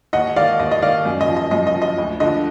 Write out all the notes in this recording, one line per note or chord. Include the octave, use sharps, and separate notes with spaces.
D#2 D#5 F#5
D#3 D5 F5
D#2 D#5
D#5
D#3 D5 F5
F#2
D#5
F3
D#5
F#2 D#5
D#5
F3
D#5
D2
D3 F3 D#5